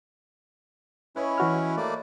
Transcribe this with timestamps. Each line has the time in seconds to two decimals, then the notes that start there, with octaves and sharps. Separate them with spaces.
1.16 C#4 E4 B4 C#5 D#5
1.38 E3 F#4 F6
1.77 A3 A#3 D5